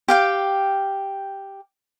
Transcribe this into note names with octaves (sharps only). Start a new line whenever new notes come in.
G4 F5 G5